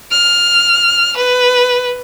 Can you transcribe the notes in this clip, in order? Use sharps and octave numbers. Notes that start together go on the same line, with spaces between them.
F6
B4